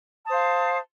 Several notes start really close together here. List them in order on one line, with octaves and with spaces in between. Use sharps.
A5 D#6 C5 F5